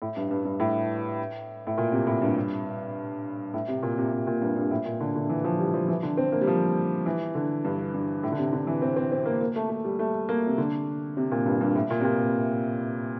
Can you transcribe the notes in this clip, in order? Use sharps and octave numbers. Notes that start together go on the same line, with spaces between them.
A2
G2
G2
G2
A2
A2
A#2
C3
A2
G2
A2
C3
A#2
C3
C3
A#2
G2
G2
A2
A#2
D3
D3
E3
F3
G3
F3
E3
D3
C4
A#3
G3
F3
E3
D3
G2
G2
A2
D3
C3
D3
E3
C4
C4
C4
A#3
A#3
A3
A3
G3
A3
A#3
C3
D3
C3
A#2
G2
G2
A2
A#2
C3
A#2